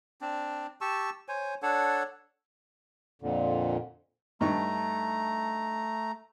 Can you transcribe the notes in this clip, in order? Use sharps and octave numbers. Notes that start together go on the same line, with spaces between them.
C4 D4
G4 A5 C#6 E6
C5 C#5 G#5
D4 A4 C#5 F#5
F2 A#2 D3
G2 A3 D#4 A#5 C#6